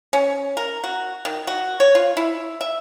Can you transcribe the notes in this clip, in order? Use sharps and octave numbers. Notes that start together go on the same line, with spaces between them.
C#4
A#4
F#4
D#3
F#4
C#5
F4
E4
E5